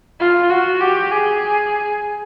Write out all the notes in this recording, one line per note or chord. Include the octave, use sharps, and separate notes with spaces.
F4
F#4
G4
G#4